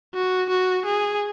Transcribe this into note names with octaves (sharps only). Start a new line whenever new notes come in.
F#4
F#4
G#4